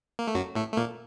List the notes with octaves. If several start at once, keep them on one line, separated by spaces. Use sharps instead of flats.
A#3
A3
F#2 F#3
A2 A3
A3
A#2 A#3